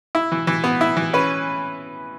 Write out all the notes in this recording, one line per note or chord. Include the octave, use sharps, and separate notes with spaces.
E4
E3
E3
B3
E4
E3
C#4 B4